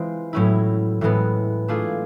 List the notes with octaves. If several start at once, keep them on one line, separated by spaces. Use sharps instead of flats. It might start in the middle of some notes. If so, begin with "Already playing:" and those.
Already playing: E3 G#3 C4 F4
A2 F#3 A3 C#4 E4
A2 E3 G#3 B3
A3 D4 F4 G#4